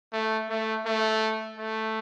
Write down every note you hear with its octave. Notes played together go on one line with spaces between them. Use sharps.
A3
A3
A3
A3